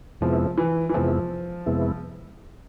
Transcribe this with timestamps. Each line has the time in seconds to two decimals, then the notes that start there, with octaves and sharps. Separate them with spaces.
0.21 F2 C3 F3 G#3 B3 E4
0.58 E3
0.89 E3
0.94 F2 C3 F3 G#3 B3 E4
1.66 F2 C3 G#3 B3 E4